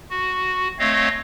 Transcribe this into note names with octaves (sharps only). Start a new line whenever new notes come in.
F#4
A3 C4 C#5 D#5 F5